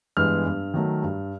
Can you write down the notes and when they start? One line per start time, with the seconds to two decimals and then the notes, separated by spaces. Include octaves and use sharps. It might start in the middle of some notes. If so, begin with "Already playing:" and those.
0.17 G2 E3 G#3 B3 F6
0.46 G2
0.74 D#3 F#3 A3
1.03 G2